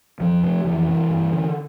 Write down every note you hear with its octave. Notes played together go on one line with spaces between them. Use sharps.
F2 F3
C3
F2 E3
C3
G2
D3